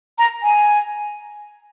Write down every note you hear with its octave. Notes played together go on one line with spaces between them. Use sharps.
A#5
G#5